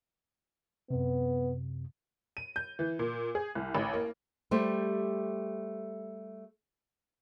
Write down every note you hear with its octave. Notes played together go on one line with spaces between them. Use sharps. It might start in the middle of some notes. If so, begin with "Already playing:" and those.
F#2 C3 B3
D#7
G6
E3
A#2
G#4
C2
A1
A#3
G3 A3 G4 C5